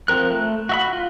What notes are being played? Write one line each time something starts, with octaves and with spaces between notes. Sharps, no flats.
F3 C4 A#4 F#6
A3 F#6
F#4 E5 B5
F4